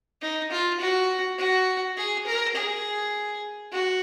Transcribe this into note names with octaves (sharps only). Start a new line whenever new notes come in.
D#4
F4
F#4
F#4
G#4
A#4
G#4
F#4